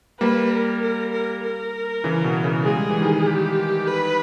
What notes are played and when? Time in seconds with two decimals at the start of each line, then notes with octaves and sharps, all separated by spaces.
0.20 G3 A#3 B4
0.51 A#4
0.82 A#4
1.13 A#4
1.43 A#4
2.04 C#3 E3
2.24 B2
2.44 C#3 E3
2.64 G#3 G#4
2.76 G3
2.89 E3
3.01 D#3 G3
3.27 G4
3.87 B4